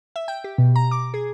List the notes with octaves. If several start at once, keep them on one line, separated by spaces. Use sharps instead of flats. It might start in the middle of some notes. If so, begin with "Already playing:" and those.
E5
G5
G4
B2
A#5
D6
G#4